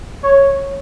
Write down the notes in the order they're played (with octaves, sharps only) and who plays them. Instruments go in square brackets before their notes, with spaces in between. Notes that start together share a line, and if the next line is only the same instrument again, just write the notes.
[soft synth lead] C#5